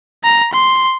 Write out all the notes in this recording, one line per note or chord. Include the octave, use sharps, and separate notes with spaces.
A#5
C6